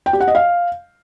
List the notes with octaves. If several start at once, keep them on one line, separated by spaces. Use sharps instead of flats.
G5
G4
F#5
D#5
F5